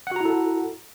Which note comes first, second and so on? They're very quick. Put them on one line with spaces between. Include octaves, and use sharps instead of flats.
F#5 F#4 A#5 E4 A4